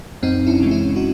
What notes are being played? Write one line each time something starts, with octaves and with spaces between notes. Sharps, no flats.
F#2 C4 D#4
C#4 E4
C#3 E3 G#3
C#4 E4
D#4 F#4